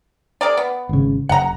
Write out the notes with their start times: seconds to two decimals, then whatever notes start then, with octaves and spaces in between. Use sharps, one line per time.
0.41 G#4 A#4 D5
0.57 B3
0.89 G#1 C#3
1.29 F#1 F#5 A#5